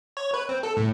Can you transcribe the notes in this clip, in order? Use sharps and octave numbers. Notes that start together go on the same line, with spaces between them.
C#5
B4
C4
A4
A2